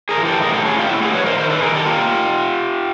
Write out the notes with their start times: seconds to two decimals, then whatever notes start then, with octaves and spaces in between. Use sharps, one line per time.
0.09 G#4 A#4
0.17 E3
0.25 G4 A4
0.42 A2 G#4 A#4
0.54 G4 A4
0.65 C#4 F#4 G#4
0.78 F4 G4
0.89 A3 E4 F#4
0.97 G4
1.02 F#4 G#4
1.14 F3 B4 C#5
1.25 A#4 C5
1.38 D#3 A#4 C5
1.50 A4 B4
1.61 D#3 G#4 A#4
1.74 G4 A4
1.86 A#3 F4 G4